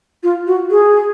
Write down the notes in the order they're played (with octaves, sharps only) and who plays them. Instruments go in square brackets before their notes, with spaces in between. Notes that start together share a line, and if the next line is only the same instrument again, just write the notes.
[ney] F4
F#4
G#4